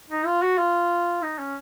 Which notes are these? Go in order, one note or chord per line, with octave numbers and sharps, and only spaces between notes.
D#4
F4
F#4
F4
D#4
C#4